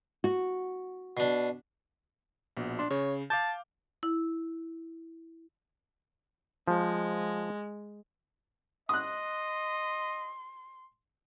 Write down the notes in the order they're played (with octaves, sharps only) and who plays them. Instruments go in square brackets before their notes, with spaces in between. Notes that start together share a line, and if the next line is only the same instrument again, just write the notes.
[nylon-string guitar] F#4
[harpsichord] B2 D4
[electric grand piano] A#1 B2
[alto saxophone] D4 [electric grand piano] C6
[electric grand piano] C#3 [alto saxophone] C#5
[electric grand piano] F5 D6 G6 [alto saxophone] A5
[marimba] E4
[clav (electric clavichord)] F3 [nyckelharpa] G#3
[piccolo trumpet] D#5 [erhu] C6 [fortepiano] D#6 F#6